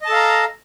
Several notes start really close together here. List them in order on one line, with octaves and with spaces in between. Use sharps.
D#5 A5 A4 F5 A#5